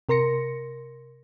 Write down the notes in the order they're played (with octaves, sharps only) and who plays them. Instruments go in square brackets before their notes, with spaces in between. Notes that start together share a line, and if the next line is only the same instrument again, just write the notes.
[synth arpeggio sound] C3 A#4 C6 A#6 C#7